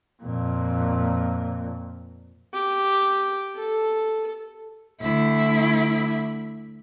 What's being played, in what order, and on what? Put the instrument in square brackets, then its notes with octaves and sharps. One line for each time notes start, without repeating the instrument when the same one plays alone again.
[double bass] F2 A#2
[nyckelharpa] G4
A4
[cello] D2 E4